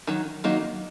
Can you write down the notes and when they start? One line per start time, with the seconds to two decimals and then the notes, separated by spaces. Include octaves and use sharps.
0.07 D#3 F#3
0.44 D#3 F#3 A#3 D#4